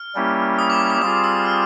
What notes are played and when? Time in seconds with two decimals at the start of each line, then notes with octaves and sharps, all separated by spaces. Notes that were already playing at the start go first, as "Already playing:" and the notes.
Already playing: F6
0.15 G3 A#3 C#4 E4 G4
0.59 D#6
0.70 D6
0.90 D#6
1.02 G3 C4 F4 G#4 D#6
1.24 E6
1.45 F6